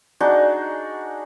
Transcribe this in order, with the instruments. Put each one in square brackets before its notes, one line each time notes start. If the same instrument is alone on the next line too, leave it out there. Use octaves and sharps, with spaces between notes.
[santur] D4 D#4 F#4 G#4